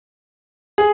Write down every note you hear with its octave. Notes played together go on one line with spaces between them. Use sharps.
G#4